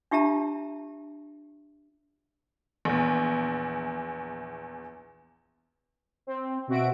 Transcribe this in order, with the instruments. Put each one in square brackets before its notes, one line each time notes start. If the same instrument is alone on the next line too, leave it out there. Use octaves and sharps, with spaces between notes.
[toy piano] D4 F4 G4 E5 A5 A#5
[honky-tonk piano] A#1 E2
[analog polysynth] C4
B2 C4 F#4 E5 D7